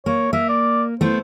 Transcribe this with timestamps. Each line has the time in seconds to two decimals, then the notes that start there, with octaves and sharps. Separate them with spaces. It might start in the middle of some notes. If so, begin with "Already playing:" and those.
0.06 A#3 C#5
0.33 A#3 E5
0.49 D5
1.01 A3 B3 E4 C5